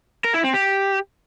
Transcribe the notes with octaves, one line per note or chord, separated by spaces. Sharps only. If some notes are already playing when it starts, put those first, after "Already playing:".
A#4
E4
C4
G4